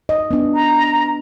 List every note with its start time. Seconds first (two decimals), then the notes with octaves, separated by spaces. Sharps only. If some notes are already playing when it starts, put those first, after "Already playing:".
0.09 D#5
0.31 B3 D4
0.55 A#5